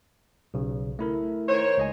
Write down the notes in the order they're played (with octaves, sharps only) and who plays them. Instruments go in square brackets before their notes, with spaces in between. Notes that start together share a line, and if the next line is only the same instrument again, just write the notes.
[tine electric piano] B1 C#3
A3 E4 A#4
[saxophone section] D#3 C5 C#5
[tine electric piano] C#2 D#5 G#5